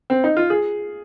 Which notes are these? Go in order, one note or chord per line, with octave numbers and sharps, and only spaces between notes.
C4
D#4
F4
G#4